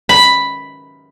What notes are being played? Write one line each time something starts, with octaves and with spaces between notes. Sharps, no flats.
B5